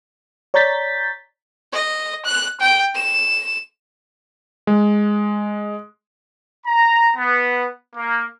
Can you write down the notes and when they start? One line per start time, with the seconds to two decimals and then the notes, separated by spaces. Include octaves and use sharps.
0.54 C#5 D5 A#5 G6 A6 B6
1.73 D#5
2.25 F#6
2.60 G5
2.95 E7
4.67 G#3
6.66 A#5
7.15 B3
7.96 A#3